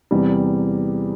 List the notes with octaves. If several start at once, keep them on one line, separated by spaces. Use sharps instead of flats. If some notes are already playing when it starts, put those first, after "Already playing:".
E2 C3 G3